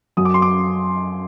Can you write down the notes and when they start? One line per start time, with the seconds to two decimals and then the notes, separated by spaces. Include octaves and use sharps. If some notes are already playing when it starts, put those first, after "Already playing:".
0.17 F#2 F#3 D#6
0.25 D6
0.34 C6
0.42 D6